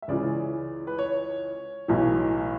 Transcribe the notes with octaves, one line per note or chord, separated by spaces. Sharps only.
E5
C#2 C#3 E3 D5
B4
C#5
B1 A2 E3